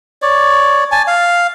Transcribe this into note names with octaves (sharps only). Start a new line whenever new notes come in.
C#5 D5
G#5 A5
F5